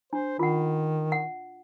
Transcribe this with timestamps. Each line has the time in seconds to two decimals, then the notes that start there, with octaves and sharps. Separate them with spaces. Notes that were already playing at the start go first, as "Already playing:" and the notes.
0.13 D4 C5
0.39 D#3 F4 F#5
1.12 F#5